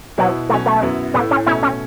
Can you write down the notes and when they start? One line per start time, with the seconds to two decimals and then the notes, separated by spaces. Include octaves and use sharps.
0.18 B2 F#3 B3 E4
0.49 B2 F#3 A3 C#4
0.66 A3
0.82 F#2 F#3 B3 E4
1.14 A2 A3 B3 E4
1.31 C#4
1.46 B2 A3 C#4 E4
1.63 C#4